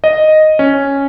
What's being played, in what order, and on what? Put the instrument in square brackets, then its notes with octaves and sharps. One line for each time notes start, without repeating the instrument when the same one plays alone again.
[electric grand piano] D#5
C#4